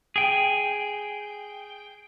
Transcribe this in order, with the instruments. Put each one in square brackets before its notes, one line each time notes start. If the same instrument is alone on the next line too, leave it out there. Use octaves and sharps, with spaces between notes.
[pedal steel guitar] G#4 G5